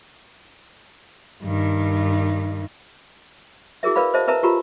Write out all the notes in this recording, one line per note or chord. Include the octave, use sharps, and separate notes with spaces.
G2 D#3
E4 F#4 G#4 A#4 E5
A#4 B4 D5 F5 B5
C5 D#5 E5 A5
A#4 B4 E5 A5 A#5
F4 G4 A#4 A#5 B5